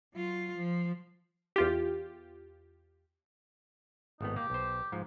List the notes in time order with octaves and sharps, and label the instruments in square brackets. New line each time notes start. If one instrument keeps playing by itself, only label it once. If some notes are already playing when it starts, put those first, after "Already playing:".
[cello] F#3 F4
F3
[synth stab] E2 F4 G4
[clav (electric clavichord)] G#1 A2 B3 [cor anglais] D#4
[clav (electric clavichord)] A#3 [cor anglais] G4
[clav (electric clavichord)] B1 C5
G#2 F3